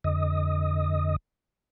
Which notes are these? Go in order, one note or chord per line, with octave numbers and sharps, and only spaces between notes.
F2 D3 D#5 D#6